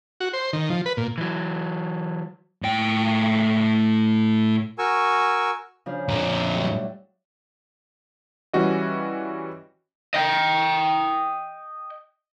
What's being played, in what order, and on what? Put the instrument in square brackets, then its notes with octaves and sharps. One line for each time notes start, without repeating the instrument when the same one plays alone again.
[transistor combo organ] F#4
C5
D#3
F3
B4
A#2
[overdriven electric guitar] E3 F#3
[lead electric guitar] A2 G5
[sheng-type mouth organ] F#4 A#4 G#5 C#6 E6
[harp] C#3 F3 D4
[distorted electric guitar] F2 A#2 [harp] A#5
[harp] E5 E6
A2 F#3 G3
[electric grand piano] E3 G3 C#4 F#4 D#5
[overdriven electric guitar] D#5 G5